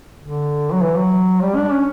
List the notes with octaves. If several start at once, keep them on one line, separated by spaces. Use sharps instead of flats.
D3
F#3
E3
F#3
G3
D4
C#4